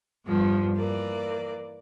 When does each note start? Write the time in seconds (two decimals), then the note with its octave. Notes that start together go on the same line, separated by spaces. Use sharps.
0.25 E2 G2 F3
0.76 E3 A#3 D5